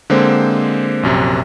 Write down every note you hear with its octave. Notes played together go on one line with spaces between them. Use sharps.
D3 G#3 A#3 C4 C5
A#1 F#2 C3